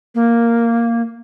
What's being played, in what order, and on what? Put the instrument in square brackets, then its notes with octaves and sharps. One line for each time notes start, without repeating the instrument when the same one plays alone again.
[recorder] A#3